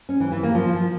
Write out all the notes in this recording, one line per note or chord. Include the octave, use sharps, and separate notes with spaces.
C#4
E3
E3
A#3
F3